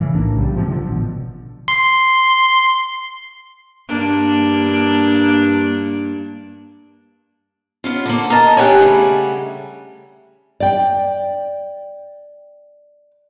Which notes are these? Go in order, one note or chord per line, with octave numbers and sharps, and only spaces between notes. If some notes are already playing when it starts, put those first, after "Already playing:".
G#2 C#3 E3
B1 A2 A#3 D4
B1 C#3 E3 G3
G#2 C3 F3
D3 F3
A1 B2
C6
G2 A#3 D4
B3 C#4 F4
D3 A#3
A#4 D#5 A5 A#5
D4 G4 C#5 F#5 G#5
C#3 G3 A3
D5 G5